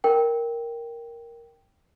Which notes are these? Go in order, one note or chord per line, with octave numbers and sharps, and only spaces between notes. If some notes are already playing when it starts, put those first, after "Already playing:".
A#4 G5